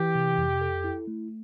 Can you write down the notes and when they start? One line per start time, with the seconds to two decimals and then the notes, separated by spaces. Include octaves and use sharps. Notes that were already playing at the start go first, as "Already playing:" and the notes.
Already playing: E3 G4
0.15 C3
0.38 F2
0.61 A4
0.84 E4
1.08 A3